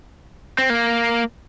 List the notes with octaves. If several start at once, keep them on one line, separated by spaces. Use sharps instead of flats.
C4
A#3